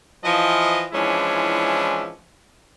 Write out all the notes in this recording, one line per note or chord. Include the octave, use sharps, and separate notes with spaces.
E3 F3 D#5
E3 F3 G#3 C#4 D4 E4